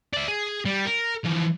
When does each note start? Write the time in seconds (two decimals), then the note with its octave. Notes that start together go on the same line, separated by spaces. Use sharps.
0.14 D5 E5
0.28 G#4
0.66 G3
0.85 A#4
1.24 E3 F3